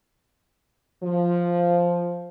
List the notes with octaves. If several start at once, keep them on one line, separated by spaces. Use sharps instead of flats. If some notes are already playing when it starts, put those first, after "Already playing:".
F3